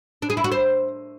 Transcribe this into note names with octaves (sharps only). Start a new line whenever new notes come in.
D4
G#4
E4
F#4
C5